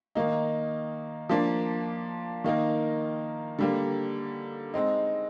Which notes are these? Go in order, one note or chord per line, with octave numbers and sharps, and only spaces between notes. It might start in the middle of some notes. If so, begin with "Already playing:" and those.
D#3 A#3 D#4
F3 A#3 D4
D#3 A#3 D#4 A#4
D3 G3 A#3
G#3 C4 D#4